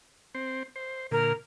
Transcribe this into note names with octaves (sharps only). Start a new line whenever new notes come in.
C4 C5
C5
A#2 D3 A#4